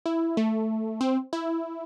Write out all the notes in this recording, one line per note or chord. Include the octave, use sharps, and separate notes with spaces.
E4
A3
C4
E4